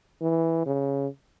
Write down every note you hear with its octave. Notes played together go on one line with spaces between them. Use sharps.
E3
C#3